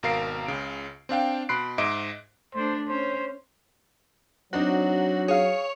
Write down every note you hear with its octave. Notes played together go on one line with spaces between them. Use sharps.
G#1 B2 A#4 F5 C7 D7
C#2 C#3 D7
C4 D4 F5 G5
B2 B5 C6 F#6 C7 D7
G#2 D#5 E5 D6 D7
A3 D4 C5
C#4 C5
F#3 C4 D4 D#4 F#4
G#4 C#5 F5